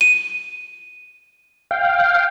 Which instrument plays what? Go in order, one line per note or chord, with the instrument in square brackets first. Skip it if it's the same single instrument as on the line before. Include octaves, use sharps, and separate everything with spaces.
[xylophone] D#7
[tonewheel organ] F5 G5